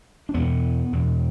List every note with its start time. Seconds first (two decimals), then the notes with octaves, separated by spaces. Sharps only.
0.29 D4
0.34 E2 B2 B3
0.93 E2 B2